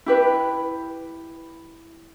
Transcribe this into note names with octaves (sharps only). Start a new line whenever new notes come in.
E4 G4 B4